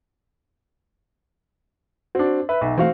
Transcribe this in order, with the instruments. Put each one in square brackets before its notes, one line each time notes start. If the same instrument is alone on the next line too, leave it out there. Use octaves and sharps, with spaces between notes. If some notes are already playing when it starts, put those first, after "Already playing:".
[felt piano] C4 D4 [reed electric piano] F#4
[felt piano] B4 [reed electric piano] E5
[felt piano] B1
[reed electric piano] E3 A3 [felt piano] C4 F#4 F5